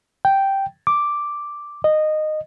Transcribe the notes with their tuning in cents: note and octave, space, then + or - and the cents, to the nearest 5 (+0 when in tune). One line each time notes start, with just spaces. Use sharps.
G5 -5
D6 +0
D#5 -15